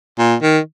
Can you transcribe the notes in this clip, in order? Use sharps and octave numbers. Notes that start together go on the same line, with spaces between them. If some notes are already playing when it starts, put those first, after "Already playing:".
A#2
D#3